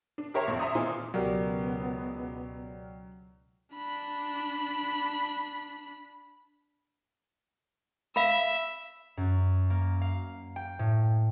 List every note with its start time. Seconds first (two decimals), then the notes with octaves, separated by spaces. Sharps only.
0.18 D4
0.34 G4 A#4 C#5 E5 A#5 C6
0.47 A#1 F2
0.60 E5 A#5 C6 D#6
0.75 A#2 E3 C4 D#4 F4 G#4
1.14 C#2 B2 F#3 B3 G4 A#4 D5
3.74 D4 B5
8.16 E5 F5 B5
9.17 F#2
9.70 A#3
10.01 F5
10.56 G5
10.79 A2